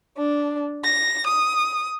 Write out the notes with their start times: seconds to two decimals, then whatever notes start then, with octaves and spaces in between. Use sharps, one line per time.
0.16 D4
0.83 A#6
1.24 D#6